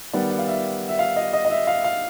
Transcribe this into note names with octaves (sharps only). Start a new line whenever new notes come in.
D#3 G3 B3 D5
F#5
F5
E5
E5
F5
D#5
D#5
D#5
E5
F5
F5